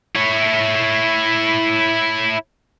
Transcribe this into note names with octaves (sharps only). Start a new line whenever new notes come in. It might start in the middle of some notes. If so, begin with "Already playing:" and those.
E4 C#5